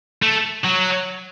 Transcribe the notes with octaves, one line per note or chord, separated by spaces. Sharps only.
A3
F#3